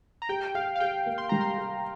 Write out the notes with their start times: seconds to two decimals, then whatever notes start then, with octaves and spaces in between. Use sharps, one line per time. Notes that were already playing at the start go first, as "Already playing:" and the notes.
0.22 A#5
0.29 G4 G5
0.46 G5
0.54 G4 F5
0.76 F5
0.80 G4 G5
1.06 A#3
1.18 C6
1.29 G3 A#5
1.41 C6
1.58 G4